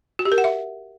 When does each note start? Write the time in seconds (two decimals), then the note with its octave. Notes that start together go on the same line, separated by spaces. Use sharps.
0.19 F#4
0.25 G4
0.32 A#4
0.38 F#5
0.44 E5